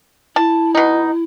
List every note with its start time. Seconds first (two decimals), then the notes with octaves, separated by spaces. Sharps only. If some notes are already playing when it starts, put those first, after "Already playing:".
0.36 E4 A5
0.75 B2 D#4